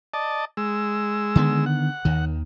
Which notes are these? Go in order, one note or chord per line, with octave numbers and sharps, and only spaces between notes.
D5 D#5 A5
G#3 E6
D3 D#3 B3
F#5
D#2 D#3